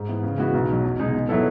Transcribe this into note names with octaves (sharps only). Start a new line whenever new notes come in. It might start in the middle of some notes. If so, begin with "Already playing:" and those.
Already playing: G#2
E3 B3
C#3
E3 G#3 B3 F#4
B1
B2 F#3
E2
B2 G#3 D#4
B2
F#3 B3 E4 A4